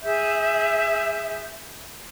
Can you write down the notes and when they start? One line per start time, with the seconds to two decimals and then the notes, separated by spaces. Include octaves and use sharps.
0.02 G#4 E5 G6